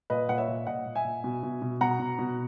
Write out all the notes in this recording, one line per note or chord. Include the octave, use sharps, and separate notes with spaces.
A#2 B4 D#5
A#2 F#5
C#5 E5
A#2
A#2 D#5 F#5
A#2
E5 G#5
A#2
B2
B2
B2
B2 F#5 A#5
B2
B2